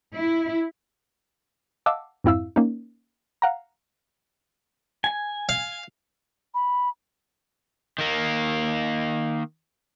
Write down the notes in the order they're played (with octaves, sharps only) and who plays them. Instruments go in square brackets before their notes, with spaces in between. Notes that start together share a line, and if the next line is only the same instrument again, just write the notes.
[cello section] E4
[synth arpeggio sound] D#5 F5 F#5 A5 D6 E6
F2 G#2 C4 E4 F5 E6
A#3 C#4 D#4
F5 F#5 A#5
[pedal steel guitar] G#5
[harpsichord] F5
[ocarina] B5
[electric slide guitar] D#3 A#3